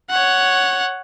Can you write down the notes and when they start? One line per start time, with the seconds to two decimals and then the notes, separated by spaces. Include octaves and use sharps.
0.10 C#5 F#5